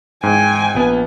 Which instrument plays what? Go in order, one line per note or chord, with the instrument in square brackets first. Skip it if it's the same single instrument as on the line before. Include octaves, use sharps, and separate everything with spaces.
[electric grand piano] G#2 [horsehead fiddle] G5 [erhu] G#5
[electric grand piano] A#1 B3